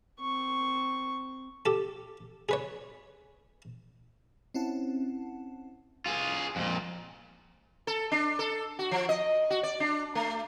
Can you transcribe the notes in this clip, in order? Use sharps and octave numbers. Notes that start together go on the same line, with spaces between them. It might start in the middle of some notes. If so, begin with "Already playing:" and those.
C4 C#6
G4 A4
G#4 B4 C#5
C4 C#4 E4 F#5 A5
F4 G#4
F2 A#2
A4
D4
A4
F#4
F3
D#5
F#4
D5
D4
A3